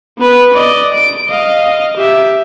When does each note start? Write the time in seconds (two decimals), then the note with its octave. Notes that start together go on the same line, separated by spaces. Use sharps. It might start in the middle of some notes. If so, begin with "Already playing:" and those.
0.18 B3 B4
0.54 D5 D#5
0.94 D7
1.29 D#5 F5
1.96 G4 E5